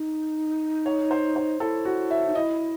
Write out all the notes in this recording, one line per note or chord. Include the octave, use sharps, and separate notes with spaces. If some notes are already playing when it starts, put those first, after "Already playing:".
Already playing: D#4
C#5
C5
C5
E4 A4
F#4
E5
D#4
E4 D#5